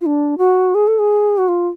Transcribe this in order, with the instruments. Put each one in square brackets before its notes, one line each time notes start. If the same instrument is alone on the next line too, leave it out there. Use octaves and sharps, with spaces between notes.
[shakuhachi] F4
D4
F#4
G#4
A4
G#4
F#4
F4